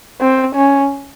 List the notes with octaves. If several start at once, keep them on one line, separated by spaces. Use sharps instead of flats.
C4
C#4